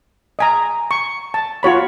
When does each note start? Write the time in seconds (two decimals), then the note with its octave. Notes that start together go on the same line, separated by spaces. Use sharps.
0.39 D#5 G#5 A#5
0.91 C#6
1.34 A5
1.63 F4 F#4 C#5 B5